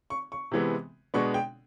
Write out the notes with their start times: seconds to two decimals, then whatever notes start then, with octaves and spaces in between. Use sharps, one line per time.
0.10 C#6
0.32 C#6
0.52 C3 E3 G#3 B3
1.14 B2 G#3 B3 D4 C#6
1.34 G5